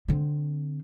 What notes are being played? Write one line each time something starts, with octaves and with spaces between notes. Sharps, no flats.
D3 C4